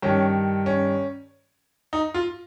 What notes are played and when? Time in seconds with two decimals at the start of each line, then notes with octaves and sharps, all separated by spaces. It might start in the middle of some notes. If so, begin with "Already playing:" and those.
0.02 G2 D#3 C#4
0.66 C#4
1.93 D#4
2.14 F4